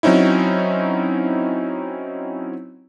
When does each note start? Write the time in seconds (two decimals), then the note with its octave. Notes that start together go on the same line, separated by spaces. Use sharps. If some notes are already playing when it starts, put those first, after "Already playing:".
0.03 F#3 C4 C#4 D#4 E4